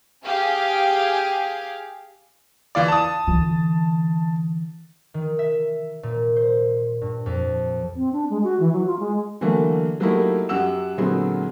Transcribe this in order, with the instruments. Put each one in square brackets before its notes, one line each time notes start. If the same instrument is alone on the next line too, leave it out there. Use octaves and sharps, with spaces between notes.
[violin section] G4 G#4 F5
[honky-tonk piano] E3 F4 D5
A5 D#6
[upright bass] D3 E3
[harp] D#3
E5
A#2
C5
G2
F2
[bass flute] C4
D4
G#3
F#4
E3
F#3
F4
G#3
[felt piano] D3 E3 F#3 A3 A#3
F#3 A3 A#3 D#4 E4 G4
F#2 F#3 G4 F#5 E6 E7
A#2 D3 F#3 G#3 B3 C4